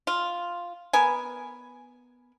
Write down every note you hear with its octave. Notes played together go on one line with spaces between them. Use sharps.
F4
B3 A#4 G#5